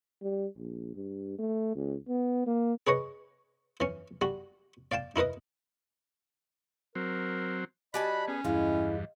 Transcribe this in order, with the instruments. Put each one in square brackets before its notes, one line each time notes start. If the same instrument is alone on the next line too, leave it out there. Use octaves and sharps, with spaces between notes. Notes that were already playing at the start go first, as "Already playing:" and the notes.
[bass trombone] G3
A#1
G2
A3
C#2
B3
A#3
[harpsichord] G#4 B4 C#5 D#5
E3 C#4
G3 F#4
D5 F5 G5 A5
D#4 E4 A#4 B4 D#5
[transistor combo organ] F#3 C4 [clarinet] A#4
[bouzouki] G3 G#5 A5 [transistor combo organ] F#4 [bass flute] D#5 [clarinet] B5
[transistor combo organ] B3 G#4 [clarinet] C#4
[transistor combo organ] E2 G2 [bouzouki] G#3 F5 [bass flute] E4